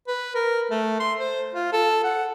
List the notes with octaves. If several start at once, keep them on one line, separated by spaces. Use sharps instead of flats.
B4
A#4
A3
C6
C5
F4
A4
F#5